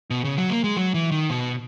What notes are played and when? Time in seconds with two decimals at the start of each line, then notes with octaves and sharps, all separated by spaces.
0.10 B2
0.24 C#3
0.37 F#3
0.50 A#3
0.64 G#3
0.77 F#3
0.94 E3
1.12 D#3
1.30 B2